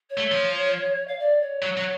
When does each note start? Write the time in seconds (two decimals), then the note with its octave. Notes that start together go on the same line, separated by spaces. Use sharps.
0.10 C#5
0.18 A3
0.31 F3
1.07 F5
1.19 D5
1.41 C#5
1.63 F#3
1.77 F#3